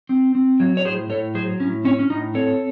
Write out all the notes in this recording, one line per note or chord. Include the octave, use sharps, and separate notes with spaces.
C4
C4
F#3
C#5
A2 G#4 C5
A2 A4 C#5
F#3 G#4 C5
A2 C#4
C4 C#4
C#4
A2 D#4
C4 A4 C#5